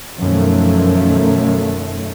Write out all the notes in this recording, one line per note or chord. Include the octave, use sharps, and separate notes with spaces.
F#2 B2 D#3 F3 A3